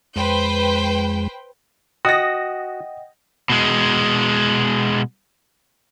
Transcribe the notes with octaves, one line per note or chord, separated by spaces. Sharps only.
F2 G#3 B4 C5 G5
F#4 D#5 F#5 G5 D#6 A#6
B2 G#3